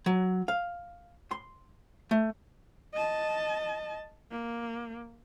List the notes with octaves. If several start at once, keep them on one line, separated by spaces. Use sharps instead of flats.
F#3
F5
C6
A3
D#5 A5
A#3